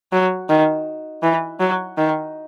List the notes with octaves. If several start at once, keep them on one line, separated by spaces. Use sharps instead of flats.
F#3
D#3
E3
F#3
D#3